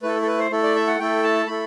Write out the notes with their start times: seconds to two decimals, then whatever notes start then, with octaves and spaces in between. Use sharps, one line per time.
0.03 A3 E4 A4 B4
0.22 A4
0.27 B4
0.39 C5
0.51 A3 E4 A4
0.63 D5
0.76 E5
0.87 F#5
0.99 A3 E4 A4 G5
1.23 A5
1.46 A3 E4 A4 B5